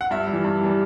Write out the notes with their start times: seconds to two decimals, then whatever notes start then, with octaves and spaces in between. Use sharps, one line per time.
0.01 F#5
0.11 G2 E5
0.27 E3 G3
0.44 G2
0.61 E3 G3